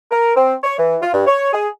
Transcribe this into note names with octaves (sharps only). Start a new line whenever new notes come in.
A#4
C4
C#5
E3
F4
G2
C#5
G#4